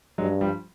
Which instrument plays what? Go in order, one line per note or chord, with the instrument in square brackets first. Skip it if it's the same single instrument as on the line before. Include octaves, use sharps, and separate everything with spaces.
[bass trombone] G2 [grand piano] F#3 G#3
[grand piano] F3 G3